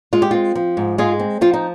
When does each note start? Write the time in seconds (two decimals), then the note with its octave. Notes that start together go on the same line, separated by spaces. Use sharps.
0.13 G#3 F4
0.22 G4
0.31 C4 F4
0.55 F3
0.77 G#2
0.98 G#3 F4 G#4
1.19 C4
1.41 F3 F4
1.53 D#4